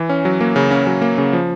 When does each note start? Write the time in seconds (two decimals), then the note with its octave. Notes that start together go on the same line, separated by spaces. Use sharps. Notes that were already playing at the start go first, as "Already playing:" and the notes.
Already playing: E3
0.09 C#4
0.25 F#3
0.41 A#3
0.56 C#3
0.71 C#4
0.87 F#3
1.02 A#3
1.18 C#3
1.33 F3